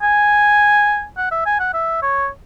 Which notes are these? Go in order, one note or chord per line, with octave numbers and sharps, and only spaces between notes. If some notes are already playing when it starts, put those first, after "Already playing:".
G#5
F#5
E5
G#5
F#5
E5
C#5